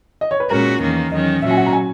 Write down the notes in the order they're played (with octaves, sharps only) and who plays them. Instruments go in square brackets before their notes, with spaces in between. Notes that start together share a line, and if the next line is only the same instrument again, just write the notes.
[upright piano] D#5
C#5
B4
[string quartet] A#2 G#3 C#4 F#4 [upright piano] A#4
[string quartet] E2 D#3 A#3 C#4
[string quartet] E2 D#3 F#3 C#4 [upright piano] D#5
[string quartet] A#2 F#3 C#4 F#4 [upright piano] E5
[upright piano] G#5
F#5
A#5
G#5